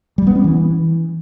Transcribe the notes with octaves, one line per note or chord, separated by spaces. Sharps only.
G3
B3
C#4
E3